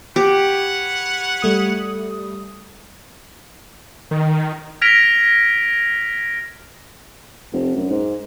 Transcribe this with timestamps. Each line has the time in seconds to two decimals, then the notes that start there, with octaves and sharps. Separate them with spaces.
0.16 G4 B4 C#5 F#5
1.42 G3 A3 D#6
4.11 D#3
4.82 F6 G#6 A#6 B6 D7 F7
7.53 F1
7.76 F#2
7.90 G#2